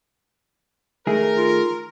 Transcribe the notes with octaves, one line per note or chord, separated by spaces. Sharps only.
D#3 A3 G#4 A#4
F4